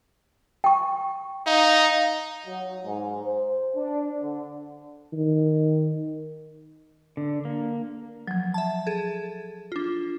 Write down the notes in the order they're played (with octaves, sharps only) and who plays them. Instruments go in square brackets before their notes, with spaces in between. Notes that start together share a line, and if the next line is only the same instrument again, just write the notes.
[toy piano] G5 C#6
[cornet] D#4 [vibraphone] F5
[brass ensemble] F#3
G#2
C5
D4
D3
[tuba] D#3
[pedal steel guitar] D3
A#3
[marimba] F3 F#3
[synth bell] E5 A5
G#4 A4
D4 F4